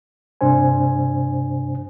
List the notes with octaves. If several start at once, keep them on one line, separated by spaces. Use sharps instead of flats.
G2 C3 D4 C5 G#5